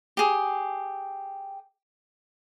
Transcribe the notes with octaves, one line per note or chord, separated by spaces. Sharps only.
G4 G#4